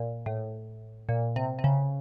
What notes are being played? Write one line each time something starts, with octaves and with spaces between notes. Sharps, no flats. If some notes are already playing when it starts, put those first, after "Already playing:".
Already playing: A#2
A2
A#2
C3
C3
C#3